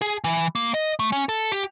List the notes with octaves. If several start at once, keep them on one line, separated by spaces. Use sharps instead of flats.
G#4
E3
A#3
D#5
A3
C#4
A4
G4